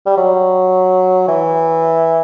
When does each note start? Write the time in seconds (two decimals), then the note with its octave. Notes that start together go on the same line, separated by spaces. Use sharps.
0.06 G3
0.17 F#3
1.28 E3